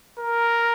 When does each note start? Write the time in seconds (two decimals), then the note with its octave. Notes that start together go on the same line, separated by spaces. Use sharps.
0.20 A#4